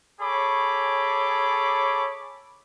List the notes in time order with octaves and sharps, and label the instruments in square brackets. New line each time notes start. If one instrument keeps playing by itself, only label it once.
[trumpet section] G#4 A4 C#5 B5 D6